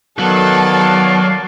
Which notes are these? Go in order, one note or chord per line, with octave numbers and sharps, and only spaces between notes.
D#3 F#3 B3 A4 D5 F5